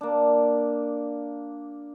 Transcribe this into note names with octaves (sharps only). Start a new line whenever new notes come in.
A#3 D4